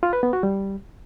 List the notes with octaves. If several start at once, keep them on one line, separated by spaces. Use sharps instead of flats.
F4
B4
B3
F#4
G3